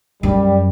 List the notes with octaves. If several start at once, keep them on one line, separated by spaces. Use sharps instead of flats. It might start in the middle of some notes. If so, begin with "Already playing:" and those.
F#2 G3